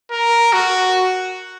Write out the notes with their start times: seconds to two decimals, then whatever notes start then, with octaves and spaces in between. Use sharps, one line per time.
0.11 A#4
0.53 F#4